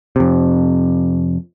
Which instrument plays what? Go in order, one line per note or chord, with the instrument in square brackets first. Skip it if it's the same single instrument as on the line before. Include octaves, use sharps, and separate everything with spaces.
[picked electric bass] F2 C3